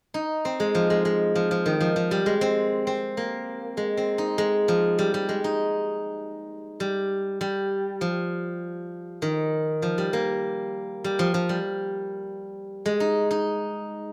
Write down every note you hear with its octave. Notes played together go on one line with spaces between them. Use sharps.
D#4
C4
G#3
F3
G#3
G#3
F3
F3
D#3
F3
F3
G3
G#3
C4
C4
A#3
G#3
C4
D#4
G#3
F3
G3
G3
G#3
D#4
G3
G3
F3
D#3
F3
G3
A#3
G3
F3
F3
G3
G#3
D#4
D#4